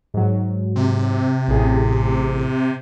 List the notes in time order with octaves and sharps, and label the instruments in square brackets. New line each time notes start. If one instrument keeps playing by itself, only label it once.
[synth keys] G#2 F#3
[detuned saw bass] C3
[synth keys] A1 A2 G#4